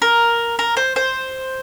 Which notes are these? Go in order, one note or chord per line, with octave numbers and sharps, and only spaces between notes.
A#4
A#4
C5
C5